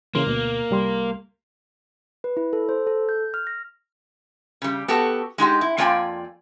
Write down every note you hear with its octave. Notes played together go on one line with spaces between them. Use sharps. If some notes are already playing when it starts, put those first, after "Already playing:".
C#3 E3 A#3 C6
D2 B2
C2 G3 C6
B4
E4
A4
C5
A4
G6
F6
A#6
C#3 G3
B3 F#4 G4 A4
G#3 D#4 F#4 G4
E4
F2 A#3 F4 D5 G5 G#5